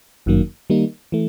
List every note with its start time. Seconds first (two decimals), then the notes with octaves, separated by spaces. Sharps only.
0.26 G1 F#2 D#3 F#3 A#3
0.70 D#3 G3 A#3 D#4
1.12 E3 A3